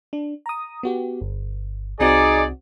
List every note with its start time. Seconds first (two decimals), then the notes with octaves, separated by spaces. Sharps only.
0.13 D4
0.46 A#5 D#6
0.83 B3 F#4 G4
1.21 G1
2.00 C2 C4 D#4 F#4 G#4 D5